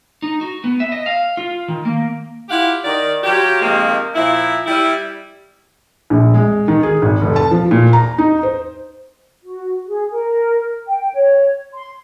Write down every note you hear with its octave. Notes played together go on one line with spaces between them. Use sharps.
D#4
F#4
B3
E5
D#5
F5
F4
D#3
A#3
E4 F4 G4 F5 F#5
D#3 D5
F#3 F4 G4
C3 D#3 F3 G#3 A#3
A#2 F3 E4
G3 E4
A#1
G#3
D#3
G#4
G#1
F1
A5
F3
A#2
A#5
D#4
C5
F#4
G#4
A#4
G5
C#5
C6